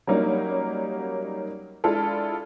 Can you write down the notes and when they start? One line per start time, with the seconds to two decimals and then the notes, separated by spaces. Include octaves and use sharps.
0.07 F#3 G3 A#3 C#4 D#4
1.84 G#3 D4 E4 F4 A4